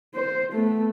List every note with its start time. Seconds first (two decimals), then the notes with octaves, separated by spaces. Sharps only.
0.14 C5
0.52 A3 B3